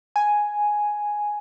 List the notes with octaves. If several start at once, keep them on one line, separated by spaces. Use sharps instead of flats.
G#5